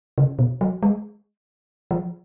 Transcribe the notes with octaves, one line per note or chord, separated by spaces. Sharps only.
C#3
B2
F#3
G#3
F3